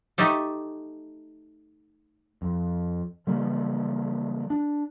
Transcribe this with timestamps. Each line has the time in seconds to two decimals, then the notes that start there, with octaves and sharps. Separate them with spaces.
0.18 A3 D#4 G4 A4
2.42 F2
3.27 C#3 E3 G3 A#3
4.50 D4